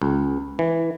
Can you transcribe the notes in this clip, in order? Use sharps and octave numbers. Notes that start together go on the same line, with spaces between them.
C#2
E3